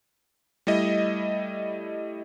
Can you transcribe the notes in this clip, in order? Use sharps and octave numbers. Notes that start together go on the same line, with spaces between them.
G3 A3 E4 D#5